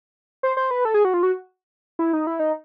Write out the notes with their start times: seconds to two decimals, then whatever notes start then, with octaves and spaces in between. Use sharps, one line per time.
0.43 C5
0.57 C5
0.71 B4
0.85 A4
0.94 G#4
1.05 F#4
1.14 F4
1.23 F#4
1.99 E4
2.13 D#4
2.27 E4
2.39 D#4